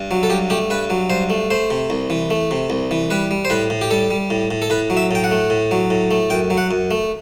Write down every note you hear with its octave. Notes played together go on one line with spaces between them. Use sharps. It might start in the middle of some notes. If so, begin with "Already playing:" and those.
Already playing: G2
F#3
A4
G2 G4
A3 G4
G2 B4
F#3
G2 C5
A3
A3 C5
C3
C2
E3
A3
C3
C2
E3
G3 B4
G3
C5
A2 B4
A2
G4
G3 A4
G3
A2
A2
A4
A2 B4
F#3
E5
A2 G5
F#5
A3
A2
F#3
A2
A3
F#2 G5
F#3
F#5
F#2
A3